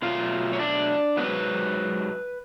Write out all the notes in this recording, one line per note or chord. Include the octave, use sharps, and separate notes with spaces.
B2 F#3 A3 F4 F5
C#5
D4 D5
G#2 F#3 B3 B4